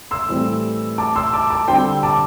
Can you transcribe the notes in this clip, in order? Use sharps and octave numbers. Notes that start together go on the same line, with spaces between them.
C6 E6
A2 E3 G3 C4
A5 D6
C6 E6
A5 D6
A5 D6
D3 G3 C4 G5 C6
A5 D6